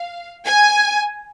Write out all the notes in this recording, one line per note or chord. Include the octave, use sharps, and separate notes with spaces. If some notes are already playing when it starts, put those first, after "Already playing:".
Already playing: F5
G#5